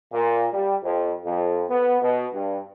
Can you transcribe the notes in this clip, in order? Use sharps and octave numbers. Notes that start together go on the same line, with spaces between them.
A#2
G3
F2
F2
B3
B2
G2